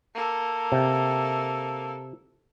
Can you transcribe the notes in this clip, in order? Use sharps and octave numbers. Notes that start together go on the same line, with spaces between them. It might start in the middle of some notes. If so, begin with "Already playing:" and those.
A#3 A4
C3